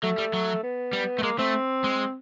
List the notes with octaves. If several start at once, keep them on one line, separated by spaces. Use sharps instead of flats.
F#3 A3
G3
F#3
B3
G3
A3
G#3 A#3
A3 C4
G#3